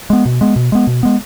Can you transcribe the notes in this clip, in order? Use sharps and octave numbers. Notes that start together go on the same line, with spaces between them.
G#3 B3
B2
G#3 B3
B2
G#3 B3
B2
G#3 B3